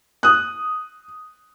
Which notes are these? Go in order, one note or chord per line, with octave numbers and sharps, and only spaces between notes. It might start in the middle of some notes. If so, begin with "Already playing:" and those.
D#6 F#6